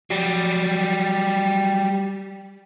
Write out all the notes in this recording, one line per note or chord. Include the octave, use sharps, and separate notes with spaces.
F#3 G3